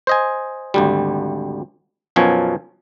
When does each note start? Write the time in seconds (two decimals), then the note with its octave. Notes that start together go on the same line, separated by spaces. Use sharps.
0.07 C5 D#5 G#5
0.74 G#1 D2 G3
2.16 B1 F#2 B2 F3 C#5 G#5